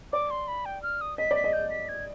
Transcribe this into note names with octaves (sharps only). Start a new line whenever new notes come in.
D5 D6
C6
B5
G5
F6
D#6
D#5 B6
D5 B6
D#5
G6
B6
G#6